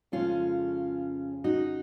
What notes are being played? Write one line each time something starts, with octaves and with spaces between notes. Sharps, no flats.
F2 C#3 G#3 C#4 F4
D#4 F#4